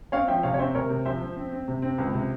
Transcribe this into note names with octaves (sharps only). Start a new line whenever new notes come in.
C4 C#5 F5
F3 E5 G5
C3 C#5 F5
C#5
C4 C5 E5
C3 A#4 C#5
C3
F3 C5 E5
F3
C4
C4
C3
C4
C#2
C3